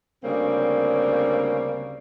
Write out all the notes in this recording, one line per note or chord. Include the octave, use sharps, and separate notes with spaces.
D2 C#3 G3 A#3 C4